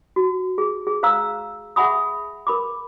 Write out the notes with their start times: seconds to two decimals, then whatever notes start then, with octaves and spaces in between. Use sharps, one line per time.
0.16 F#4
0.58 G#4
0.87 G#4
1.03 C5 F5 A#5 E6
1.76 G#4 E5 F#5 G#5 B5 D#6
2.47 A#4 B5 D6